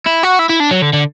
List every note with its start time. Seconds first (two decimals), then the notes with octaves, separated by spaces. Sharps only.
0.06 E4
0.23 F#4
0.39 E4
0.49 E4
0.60 D4
0.71 F#3
0.82 D3
0.93 D3